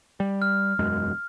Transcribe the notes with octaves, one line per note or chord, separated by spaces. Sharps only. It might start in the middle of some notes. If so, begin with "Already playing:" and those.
G3
F6
E1 F#2 G#3